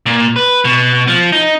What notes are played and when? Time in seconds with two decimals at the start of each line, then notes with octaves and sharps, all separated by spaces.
0.06 A#2
0.36 B4
0.65 B2
1.08 F3
1.32 D#4